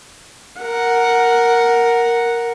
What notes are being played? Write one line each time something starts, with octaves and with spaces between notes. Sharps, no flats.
A#4 F#5